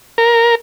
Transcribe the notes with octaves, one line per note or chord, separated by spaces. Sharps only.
A#4